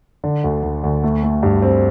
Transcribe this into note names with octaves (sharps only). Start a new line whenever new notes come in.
D3
D2
D2
D2
A3
A3
G2
C4